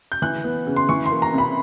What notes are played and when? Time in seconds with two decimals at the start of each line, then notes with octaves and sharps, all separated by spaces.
0.12 G6
0.22 E3 F#6
0.44 B3
0.67 C#3
0.76 C6
0.89 E3 C#6
1.06 C6
1.11 A#3
1.22 A#5
1.33 C3
1.38 B5